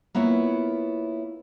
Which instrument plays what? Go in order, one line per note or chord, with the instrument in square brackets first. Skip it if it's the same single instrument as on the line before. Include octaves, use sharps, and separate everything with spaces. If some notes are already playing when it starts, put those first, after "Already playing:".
[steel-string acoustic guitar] A#3 B3 E4 F4 C#5